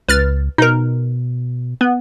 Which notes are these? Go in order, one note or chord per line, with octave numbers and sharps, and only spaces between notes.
C#2 B4 F6 A6
B2 D#4 A#4
B3